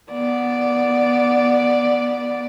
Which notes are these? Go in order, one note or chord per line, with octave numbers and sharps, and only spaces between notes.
B3 D5